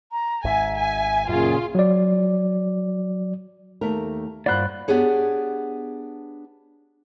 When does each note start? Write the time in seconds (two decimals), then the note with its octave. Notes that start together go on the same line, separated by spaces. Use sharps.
0.11 A#5
0.44 G#1 G#2 E5 G#5
0.78 G#5
1.29 F#2 A#2 C#3 F4 G#5
1.75 F#3 D5
3.81 D#2 A3 A#4
4.46 G2 A#3 F4 C5 D5 F#5 B5 F#6
4.88 B3 D4 G4 G#4 C#5